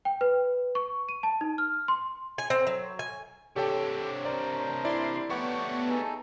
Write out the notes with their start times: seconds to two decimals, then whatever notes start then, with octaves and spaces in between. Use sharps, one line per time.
0.05 G5
0.21 B4
0.75 C#6
1.09 D#7
1.23 A5
1.41 D#4
1.58 F6
1.88 C6
2.38 G#5
2.50 C4
2.67 F#3
2.99 G#5
3.56 C3 D4 G4 A4 C#5 G5
4.25 A#4 C5 D5
4.85 E4 D5 C6
5.30 A3 B3 G4 C#5 D5 F#5 C#6
5.89 D#4 G#4 A4